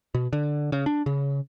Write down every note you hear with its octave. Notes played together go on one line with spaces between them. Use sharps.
B2
D3
C#3
D4
C#3